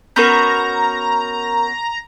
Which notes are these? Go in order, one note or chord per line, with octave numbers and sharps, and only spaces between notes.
B3 C#4 F#4 A#4 A#5 C#6 G6